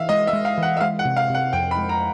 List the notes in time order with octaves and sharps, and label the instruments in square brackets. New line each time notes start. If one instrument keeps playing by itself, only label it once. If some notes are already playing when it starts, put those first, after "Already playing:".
Already playing: [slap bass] E3 [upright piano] E5 F5
[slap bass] G#3 [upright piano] D#5
[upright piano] E5
[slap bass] G#3
[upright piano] F5
[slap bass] E3 [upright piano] F#5
[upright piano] E5
[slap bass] G#3 [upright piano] F5
[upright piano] F#5
[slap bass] C3
[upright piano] F5
[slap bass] C3
[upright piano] F#5
[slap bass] F2 [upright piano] G5
[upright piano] B5
[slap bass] G#3
[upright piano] A#5